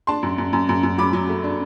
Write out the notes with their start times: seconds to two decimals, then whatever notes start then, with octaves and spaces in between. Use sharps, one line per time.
0.07 D4 A5 C6
0.23 F#2
0.38 F#2
0.53 F#2
0.69 F#2
0.83 F#2
0.98 F#3 B5 D6
1.13 F#3
1.29 A3
1.44 D4